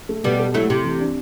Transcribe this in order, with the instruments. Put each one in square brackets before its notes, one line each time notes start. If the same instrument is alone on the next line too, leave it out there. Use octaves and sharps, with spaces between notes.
[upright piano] A3
[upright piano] B2 [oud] G3 B3
[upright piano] A4
[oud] F#3 A3 [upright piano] E4
[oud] C3 [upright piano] A3
[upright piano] E3
D4